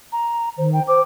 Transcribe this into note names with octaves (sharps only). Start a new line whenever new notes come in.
A#5
D#3 C5
G5
C5 D6